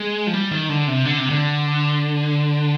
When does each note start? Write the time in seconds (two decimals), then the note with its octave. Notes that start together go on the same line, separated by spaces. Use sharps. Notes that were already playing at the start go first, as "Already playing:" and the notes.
Already playing: G#3
0.27 F3
0.34 G3
0.51 D#3
0.69 D3
0.88 C3
1.05 D3
1.18 C3
1.30 D3